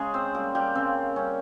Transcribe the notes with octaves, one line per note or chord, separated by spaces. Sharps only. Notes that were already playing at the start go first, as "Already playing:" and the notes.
Already playing: C#3 G#3 G#4
C4 C5
G3 A#3 A#4
G3 G4
C#3 C4
G3 C#4